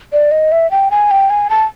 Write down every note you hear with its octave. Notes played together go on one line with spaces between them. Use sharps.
D5
D#5
E5
G5
G#5
G5
G#5
A5